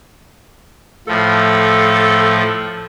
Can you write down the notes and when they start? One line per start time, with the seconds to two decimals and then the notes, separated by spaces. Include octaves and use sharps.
1.08 A2 F3 A4